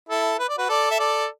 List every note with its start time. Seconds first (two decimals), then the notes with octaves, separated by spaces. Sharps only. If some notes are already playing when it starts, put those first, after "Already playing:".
0.09 E4 A4
0.39 B4
0.49 D5
0.58 F#4 B4
0.69 A4 D5
0.91 E5
0.99 A4 D5